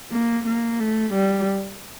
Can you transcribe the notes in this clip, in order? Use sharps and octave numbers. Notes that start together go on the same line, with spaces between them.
A#3
A#3
A3
G3